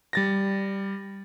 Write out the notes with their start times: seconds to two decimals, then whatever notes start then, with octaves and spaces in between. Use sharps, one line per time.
0.13 G3 A6 A#6